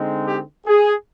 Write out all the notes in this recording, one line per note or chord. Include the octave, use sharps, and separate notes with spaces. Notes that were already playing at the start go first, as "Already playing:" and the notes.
Already playing: D3 G#3 C4 D#4
G4
G#4